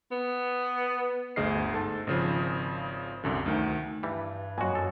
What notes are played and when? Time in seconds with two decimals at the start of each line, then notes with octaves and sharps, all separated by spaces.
0.12 B3
1.36 G1 D2 G#4 D#5 F6 C7
1.73 G#2 A4 A5
2.07 G#1 C#3 F3
3.24 C2 F#2 D3
3.46 D2 D#3
4.03 G2 E3 G3
4.58 F#2 A#2 F#4 D#5 G#5
4.75 A4